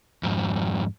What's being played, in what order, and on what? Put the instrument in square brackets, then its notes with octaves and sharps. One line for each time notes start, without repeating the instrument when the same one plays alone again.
[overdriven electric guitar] F2 G#2